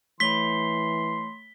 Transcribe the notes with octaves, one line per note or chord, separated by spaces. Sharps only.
E3 A3 C#5 B5 C6 B6 G7